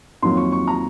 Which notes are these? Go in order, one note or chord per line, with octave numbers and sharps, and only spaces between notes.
F2 D#3 F#3 A#3 C6
C#6
C#6
A#5